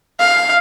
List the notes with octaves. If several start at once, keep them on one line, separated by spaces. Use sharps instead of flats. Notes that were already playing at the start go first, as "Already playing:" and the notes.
F5